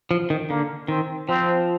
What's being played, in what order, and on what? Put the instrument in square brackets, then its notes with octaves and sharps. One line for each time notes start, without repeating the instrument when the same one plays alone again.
[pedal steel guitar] F3
D#3
[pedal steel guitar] D3 [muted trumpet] A#3
[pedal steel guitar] D#3 [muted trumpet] C4
[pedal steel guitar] F3 [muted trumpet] C4